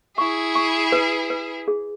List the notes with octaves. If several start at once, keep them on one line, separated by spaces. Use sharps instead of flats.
E4 G#4 C#6
C#6
B4
B4
G#4